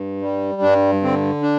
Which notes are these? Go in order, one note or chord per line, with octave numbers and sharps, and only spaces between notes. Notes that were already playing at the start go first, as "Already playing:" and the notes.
Already playing: G2
G3
G2 D4
D3 C4
D4